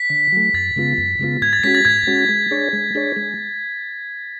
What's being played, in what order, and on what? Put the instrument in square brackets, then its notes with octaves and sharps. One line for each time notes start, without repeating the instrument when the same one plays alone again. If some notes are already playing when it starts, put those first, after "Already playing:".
Already playing: [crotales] B6
[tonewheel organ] D3
F#3 A3
[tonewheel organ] F#2 [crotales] A6
[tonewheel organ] C#3 G#3 B3 F4
F#2
C#3 G#3 B3 F4
[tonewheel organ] G#2 [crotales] G#6
[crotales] A6
[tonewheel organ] G#3 C#4 F#4 [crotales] B6
[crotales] A6
[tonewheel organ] G#2 [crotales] G#6
[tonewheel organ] G#3 C#4 F#4
G#3
D4 G#4 C#5
G#3
D4 G#4 C#5
G#3